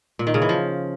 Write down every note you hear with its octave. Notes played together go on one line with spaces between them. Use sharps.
A#2
D#3
C#3
E3
F3